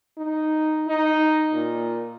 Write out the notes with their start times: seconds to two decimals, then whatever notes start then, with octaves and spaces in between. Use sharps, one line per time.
0.18 D#4
0.88 D#4
1.53 A#2